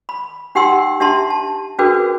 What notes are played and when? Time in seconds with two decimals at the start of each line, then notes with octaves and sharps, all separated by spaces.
0.09 B5
0.55 D#4 G4 F#5 G5 C6 E6
1.00 D4 G4 E5 A5 A#5 C6
1.30 A5
1.79 C#4 D4 F#4 G#4 A#4 B4